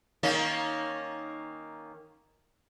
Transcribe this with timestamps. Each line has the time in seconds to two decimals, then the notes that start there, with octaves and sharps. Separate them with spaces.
0.23 D#3 A#3 C#4